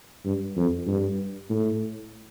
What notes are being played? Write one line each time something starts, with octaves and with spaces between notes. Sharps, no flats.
G2
F2
G2
A2